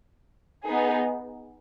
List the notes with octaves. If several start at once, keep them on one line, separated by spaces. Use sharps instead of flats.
B3 D#4 G#4